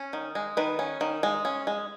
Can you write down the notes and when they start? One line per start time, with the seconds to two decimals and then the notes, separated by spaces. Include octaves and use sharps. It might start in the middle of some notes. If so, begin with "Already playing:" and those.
Already playing: C#4
0.13 D#3
0.35 G#3
0.57 D#3 B4
0.79 C#4
1.01 D#3
1.23 G#3
1.45 C#4
1.67 G#3